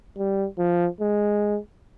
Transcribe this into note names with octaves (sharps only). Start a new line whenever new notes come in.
G3
F3
G#3